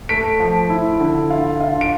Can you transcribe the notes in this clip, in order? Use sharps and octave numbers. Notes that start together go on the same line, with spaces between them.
A3 B6 D7
F3
E4
D3
F4
F4
D7